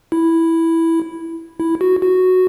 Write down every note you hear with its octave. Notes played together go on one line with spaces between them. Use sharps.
E4
E4
F#4
F#4